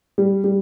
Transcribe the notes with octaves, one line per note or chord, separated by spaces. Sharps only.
G3
G3